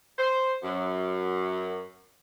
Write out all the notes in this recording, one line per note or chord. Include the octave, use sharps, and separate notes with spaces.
C5
F#2